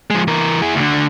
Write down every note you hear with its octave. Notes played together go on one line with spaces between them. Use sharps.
F3 G#3
E3 A#4
E4 G#4
D2 D3